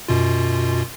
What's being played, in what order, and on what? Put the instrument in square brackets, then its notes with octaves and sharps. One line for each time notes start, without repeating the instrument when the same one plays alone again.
[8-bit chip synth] F#2 B2 F4